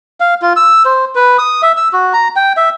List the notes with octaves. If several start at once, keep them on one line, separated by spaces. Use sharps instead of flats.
F5
F4
E6
C5
B4
D#6
E5
E6
F#4
A#5
G5
E5